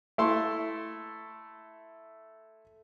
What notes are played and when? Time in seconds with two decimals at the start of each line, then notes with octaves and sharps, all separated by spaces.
0.18 A3 E4 A4 C6